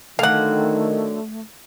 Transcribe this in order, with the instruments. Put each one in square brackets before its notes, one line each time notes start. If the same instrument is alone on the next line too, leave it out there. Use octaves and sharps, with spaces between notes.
[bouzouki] D3 F#3 [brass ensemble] D#3 [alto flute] A3 [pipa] F5 F#5